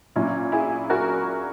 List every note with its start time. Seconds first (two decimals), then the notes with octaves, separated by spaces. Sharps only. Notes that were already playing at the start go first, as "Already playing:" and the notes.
0.16 A#2 F#3 C#4 E4
0.52 E4 G#4
0.90 F#4 A#4